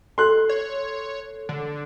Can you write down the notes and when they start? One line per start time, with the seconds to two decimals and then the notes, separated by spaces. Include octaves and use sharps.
0.18 A4 C6 F#6
0.49 C#5
1.49 D3